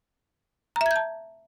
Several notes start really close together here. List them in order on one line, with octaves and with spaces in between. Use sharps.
A#5 E5 G#6 G6 A5